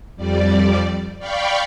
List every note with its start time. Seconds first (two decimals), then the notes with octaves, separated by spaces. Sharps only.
0.16 F2 G3 D5
1.19 D5 F5 G5 B5 C#6